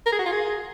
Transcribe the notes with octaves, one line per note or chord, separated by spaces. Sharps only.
A#4
G#4
F#4
F4
G#4